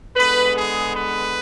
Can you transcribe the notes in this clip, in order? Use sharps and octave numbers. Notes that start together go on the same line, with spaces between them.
D3 G#3 B3 B4
G#4
B4